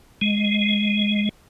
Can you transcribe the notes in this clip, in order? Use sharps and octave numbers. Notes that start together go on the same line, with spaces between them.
G#3